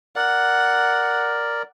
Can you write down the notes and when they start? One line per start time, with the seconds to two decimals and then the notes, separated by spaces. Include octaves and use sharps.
0.16 A#4 D5 F#5